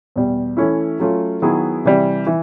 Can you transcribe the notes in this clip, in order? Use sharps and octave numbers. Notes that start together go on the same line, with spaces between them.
E2 B2 G3
E3 A3 C#4 E4
F#3 A3 C#4 F4
D#3 F#3 B3 E4 G#4
C3 E3 G3
E3